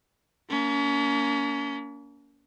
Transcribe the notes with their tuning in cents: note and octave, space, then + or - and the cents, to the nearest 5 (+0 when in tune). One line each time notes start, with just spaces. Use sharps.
A#3 -5 C#4 +40